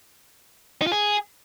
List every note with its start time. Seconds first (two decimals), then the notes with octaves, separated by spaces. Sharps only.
0.82 D#4
0.87 F4
0.92 G#4